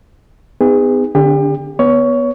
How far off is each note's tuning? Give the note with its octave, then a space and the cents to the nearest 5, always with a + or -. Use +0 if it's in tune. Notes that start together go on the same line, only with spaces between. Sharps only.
B3 +35 D#4 +0 G#4 -35
D3 +0 D4 -40 G4 +35
B3 -10 C#5 +20